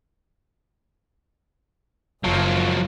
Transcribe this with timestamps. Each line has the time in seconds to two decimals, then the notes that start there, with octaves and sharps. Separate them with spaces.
2.24 F#1 F3 F#3